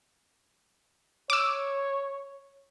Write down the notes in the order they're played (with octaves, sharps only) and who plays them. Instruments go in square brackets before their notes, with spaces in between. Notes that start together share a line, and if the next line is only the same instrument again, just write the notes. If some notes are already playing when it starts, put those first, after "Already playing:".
[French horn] C#5 [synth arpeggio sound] D6 E6